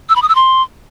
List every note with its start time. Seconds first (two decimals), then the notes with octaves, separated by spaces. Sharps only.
0.09 E6
0.16 B5
0.22 D#6
0.29 E6
0.35 C6